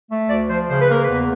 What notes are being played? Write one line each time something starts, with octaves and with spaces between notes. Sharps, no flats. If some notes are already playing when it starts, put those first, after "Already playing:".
A3
D2 D5
F3 C5
C#3 C5
B4
A#3 A#4
B4
E2